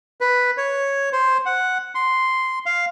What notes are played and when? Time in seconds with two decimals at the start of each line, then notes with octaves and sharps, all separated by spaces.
0.21 B4
0.57 C#5
1.13 C5
1.46 F#5
1.95 C6
2.66 F5